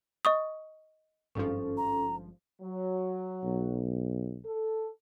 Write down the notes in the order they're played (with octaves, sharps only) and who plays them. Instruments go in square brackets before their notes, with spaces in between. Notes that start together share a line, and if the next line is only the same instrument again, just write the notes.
[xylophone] D#5 C#6 D#6
[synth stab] G#1 G2 F3 [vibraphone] C#4 A4
[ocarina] A#5
[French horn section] F#3
[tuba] B1
[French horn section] A4